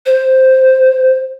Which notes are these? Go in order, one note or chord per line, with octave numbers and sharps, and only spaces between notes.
C5